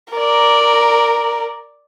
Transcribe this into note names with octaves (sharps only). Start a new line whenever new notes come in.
A#4 D5